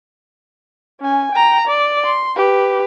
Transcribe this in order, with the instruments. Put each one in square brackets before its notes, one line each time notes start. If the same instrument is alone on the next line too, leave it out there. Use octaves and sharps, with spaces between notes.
[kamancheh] C#4 G#5
G5 A#5
D5
C6
G4 B4